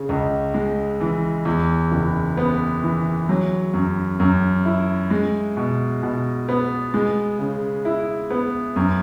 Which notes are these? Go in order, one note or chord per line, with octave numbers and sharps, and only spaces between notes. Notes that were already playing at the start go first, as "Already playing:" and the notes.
Already playing: C#3
C#2
G#3
E3
E2
F#1
B3
E3
F#3
F#2
F#2
E4
G#3
B2
B2
B3
G#3
C#3
E4
B3
F#2